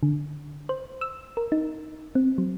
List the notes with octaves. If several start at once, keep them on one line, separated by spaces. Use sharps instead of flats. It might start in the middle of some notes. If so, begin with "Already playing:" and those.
D3
C5
E6
A#4
D#4
C4
F#3